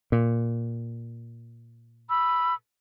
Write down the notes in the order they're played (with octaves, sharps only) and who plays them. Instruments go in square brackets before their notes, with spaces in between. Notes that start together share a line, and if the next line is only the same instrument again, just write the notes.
[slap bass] A#2
[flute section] B5 E6